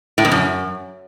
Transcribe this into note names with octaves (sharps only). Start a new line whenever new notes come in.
A2
F2
F#2